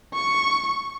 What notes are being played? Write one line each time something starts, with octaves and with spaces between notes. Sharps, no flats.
C#6